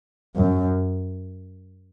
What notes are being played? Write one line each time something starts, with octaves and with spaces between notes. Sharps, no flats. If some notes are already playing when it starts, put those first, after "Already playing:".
F#2